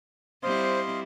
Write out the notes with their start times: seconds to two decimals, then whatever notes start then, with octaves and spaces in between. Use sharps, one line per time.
0.43 G3 C4 E4 C5 D#5 F5 C6